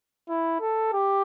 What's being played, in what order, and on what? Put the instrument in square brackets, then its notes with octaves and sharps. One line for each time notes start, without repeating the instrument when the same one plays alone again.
[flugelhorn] E4
A4
G4